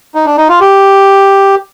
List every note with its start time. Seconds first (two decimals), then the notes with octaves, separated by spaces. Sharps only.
0.15 D#4
0.26 D4
0.37 D#4
0.49 F4
0.61 G4